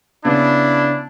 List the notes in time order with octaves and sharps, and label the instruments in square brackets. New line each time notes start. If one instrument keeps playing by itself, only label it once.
[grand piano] C#3 B3 [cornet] D4 [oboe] E4